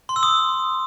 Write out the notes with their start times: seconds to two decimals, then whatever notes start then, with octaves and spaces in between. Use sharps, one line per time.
0.09 C6
0.16 E6
0.23 D#6